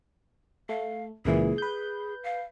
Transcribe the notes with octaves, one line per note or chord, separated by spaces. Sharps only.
A3 F5
C#2 A#2 E3 G#4
B4 G6
F5